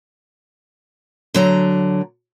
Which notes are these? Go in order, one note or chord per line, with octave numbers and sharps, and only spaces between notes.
D3 F#3 A#5